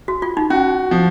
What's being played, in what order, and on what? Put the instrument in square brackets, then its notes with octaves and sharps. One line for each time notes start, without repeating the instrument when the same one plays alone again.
[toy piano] F#4
F4
D#4
[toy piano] C#4 [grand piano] F#4
[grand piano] F3